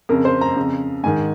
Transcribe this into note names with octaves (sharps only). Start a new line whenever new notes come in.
F2 C#3 A#4
C5
A#5
F2 C#3
G#2 D#3 G#5